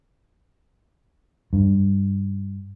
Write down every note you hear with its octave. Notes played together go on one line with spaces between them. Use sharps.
G2